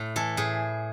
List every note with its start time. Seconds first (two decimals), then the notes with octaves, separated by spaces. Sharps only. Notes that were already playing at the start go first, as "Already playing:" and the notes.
Already playing: A2
0.16 E3 A4
0.37 A2 G#4